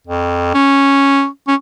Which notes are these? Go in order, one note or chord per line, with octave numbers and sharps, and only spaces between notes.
F2
C#4
C#4